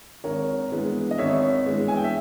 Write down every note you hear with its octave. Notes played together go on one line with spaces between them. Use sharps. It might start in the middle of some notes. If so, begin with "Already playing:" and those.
G#1 A#4 C#5
G2 E3 G#3 B3
D#5
G#1 C#5 E5
G2 E3 G#3 B3
G#5
G5
E5